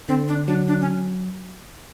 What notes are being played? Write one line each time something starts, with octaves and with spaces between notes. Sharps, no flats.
D3 C4
D4
F#3 D4
D4
C#4